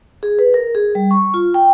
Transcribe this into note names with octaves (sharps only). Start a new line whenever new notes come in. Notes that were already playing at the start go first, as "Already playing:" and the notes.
G#4
B4
A#4
G#4
G3
C#6
F4
G5